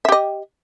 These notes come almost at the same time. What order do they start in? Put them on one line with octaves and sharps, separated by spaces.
E5 G4 D#5